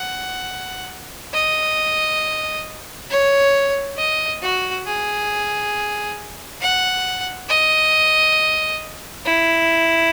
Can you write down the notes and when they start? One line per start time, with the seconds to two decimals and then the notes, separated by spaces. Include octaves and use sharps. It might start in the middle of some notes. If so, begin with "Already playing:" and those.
Already playing: F#5
1.34 D#5
3.10 C#5
3.97 D#5
4.42 F#4
4.86 G#4
6.61 F#5
7.49 D#5
9.25 E4